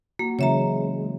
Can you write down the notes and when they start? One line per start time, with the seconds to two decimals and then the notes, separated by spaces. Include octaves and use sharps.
0.19 A#3 F#4
0.39 C#3 E3 F#3 G#3 C#5 E5 A#5